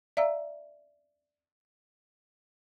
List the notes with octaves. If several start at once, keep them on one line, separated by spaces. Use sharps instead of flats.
D5 E5 F5 A#5 E6